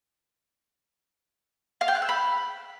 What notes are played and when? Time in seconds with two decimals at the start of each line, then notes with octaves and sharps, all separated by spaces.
1.81 F5
1.88 G5
1.95 F#6
2.02 E6
2.09 B5